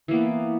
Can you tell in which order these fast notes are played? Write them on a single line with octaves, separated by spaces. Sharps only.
E3 A#3 B3